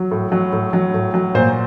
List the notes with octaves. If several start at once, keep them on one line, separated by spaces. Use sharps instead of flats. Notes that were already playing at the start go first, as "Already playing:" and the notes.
Already playing: F#3
A2
F#3
A2
F#3
A2
F#3
A#2 C5